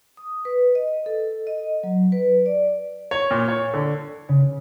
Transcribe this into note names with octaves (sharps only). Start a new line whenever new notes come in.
D#6
B4
D#5
A4
D#5
F#3
B4
D5
C#5
A#2
C#5
D3
C#3